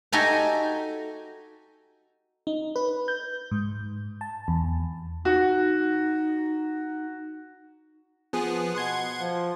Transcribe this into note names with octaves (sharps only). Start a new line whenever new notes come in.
D#4 F#4 G4 A4 G#5 A#5
D#4
B4
G6
G#2
A5
E2
D#4 F#4
F3 B3 G#4
B2 F#5 C6 G#6
F3